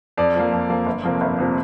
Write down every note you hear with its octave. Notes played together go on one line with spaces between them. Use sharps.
F2 D5
F3 A#3
F2
F3 A#3
G1
F2 C3 F3 A#3
G1
F2 C3 F3 A#3